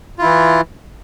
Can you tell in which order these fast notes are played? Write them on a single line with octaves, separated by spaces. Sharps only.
F4 E4 E3